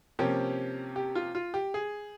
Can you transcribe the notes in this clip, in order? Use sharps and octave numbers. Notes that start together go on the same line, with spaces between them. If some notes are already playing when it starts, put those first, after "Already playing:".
C3 F3 A#3 C#4 G4
G4
F4
F4
G4
G#4